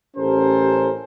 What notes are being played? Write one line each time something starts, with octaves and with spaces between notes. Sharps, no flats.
A1 C#4 G4 A4 A#4 C5